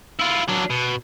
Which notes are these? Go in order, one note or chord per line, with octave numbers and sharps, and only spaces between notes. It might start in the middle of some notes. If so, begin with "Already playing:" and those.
E4 F4
F#3 D4
B2